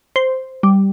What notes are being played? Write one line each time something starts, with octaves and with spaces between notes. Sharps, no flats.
C5
G3